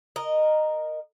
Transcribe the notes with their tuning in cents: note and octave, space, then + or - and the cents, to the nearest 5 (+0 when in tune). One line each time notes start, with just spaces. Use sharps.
A#4 +0 D#5 -15